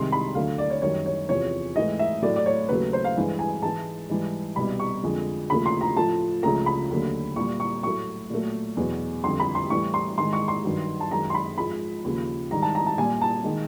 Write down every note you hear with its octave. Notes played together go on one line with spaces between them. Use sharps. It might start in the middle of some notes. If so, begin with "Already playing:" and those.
Already playing: C2 C3 D#3 G#3 C6
B5
D2 D3 F#3 A3 F5
D5
C#5
F#2 D#3 G3 C#5
C#5
E2 C3 F3 C#5
G#2 E3 A3 D#5
E5
A2 F#3 A3 D5
D5
C#5
D#2 C#3 F#3 A3 B4
C5
F5
G2 E3 G#3
G#5
G#2 E3 G#3 A5
G#2 E3 G3
C2 B2 G3 B5
C#6
F2 D3 F3 G#3
D#2 C#3 F3 A3 B5
C6
A#5
A2 F3 A3 A5
C#2 C#3 F3 A3 A#5
B5
D#2 D3 F#3 A3
A#2 G3 C#6
C#6
A2 F#3 A3 C#6
A#2 F#3 A3
E2 B2 F#3
F2 D3 G3 C6
B5
C6
A2 E3 G3 C#6
C6
G#2 D#3 G#3 C6
C#6
C6
G2 D#3 F#3
A5
F#2 D#3 G#3 A#5
C6
B5
G#2 F3 G#3 B5
D#2 C#3 F3
G#2 D#3 G3 A#5
A5
A#5
A5
A#2 G3 G#5
A5
D#3 G#3